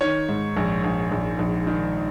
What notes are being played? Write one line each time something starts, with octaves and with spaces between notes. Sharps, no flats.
D#3 C#5
G#2
A#1
A#1
A#1
A#1
D#3